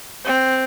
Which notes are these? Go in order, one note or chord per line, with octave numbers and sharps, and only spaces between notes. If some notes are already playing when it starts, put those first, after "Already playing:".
C4